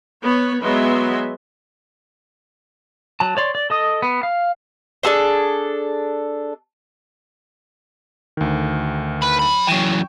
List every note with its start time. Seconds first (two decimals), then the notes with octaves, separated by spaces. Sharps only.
0.22 B3 C#5 B5
0.62 F#3 G#3 B3 E5 C6
3.20 F#3 A5
3.37 C#5 D5 C6
3.55 D5
3.70 A4 D#5 D#6
4.02 B3
4.23 F5
5.03 D4 G#4 A4 C5
8.37 D2 D#3
9.22 B4 B5
9.39 F#3 B5
9.67 F#2 E3 G5 C#6